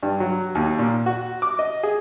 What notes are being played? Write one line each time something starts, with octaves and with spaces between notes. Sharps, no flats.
G2
F#3
D#2
A#2
F#4
D6
D#5
G#4